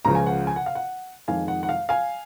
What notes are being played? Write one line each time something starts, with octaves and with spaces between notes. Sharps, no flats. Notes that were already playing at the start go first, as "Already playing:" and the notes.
C#2 C#3 F3 A#5
G#5
F#5
G#5
F#5
F5
F#5
F2 D#3 G#3 F5 G#5
F#5
F#5
F5
F5 G#5